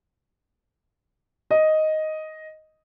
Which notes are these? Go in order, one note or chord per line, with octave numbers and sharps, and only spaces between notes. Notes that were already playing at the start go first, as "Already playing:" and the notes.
D#5